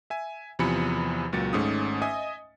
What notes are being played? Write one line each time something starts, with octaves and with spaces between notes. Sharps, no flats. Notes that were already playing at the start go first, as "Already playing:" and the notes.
E5 G#5
E2 C3 F3 G#5 B5 C#7
C#2 A#2 F#3 A6 C#7
G#1 G#2 A3 C#4 D#6
D#5 E5 G#5 D#6